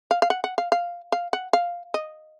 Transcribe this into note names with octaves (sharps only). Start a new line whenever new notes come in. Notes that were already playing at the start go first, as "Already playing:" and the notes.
F5
F5
F#5
F#5
F5
F5
F5
F#5
F5
D#5